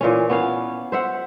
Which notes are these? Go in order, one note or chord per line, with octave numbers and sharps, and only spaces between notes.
A#2 E3 C#4
B3 C#4 F5
C5 E5 F#5